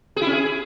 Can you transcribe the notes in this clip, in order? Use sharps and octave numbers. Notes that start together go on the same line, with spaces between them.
G#4
E4
C#4
G#4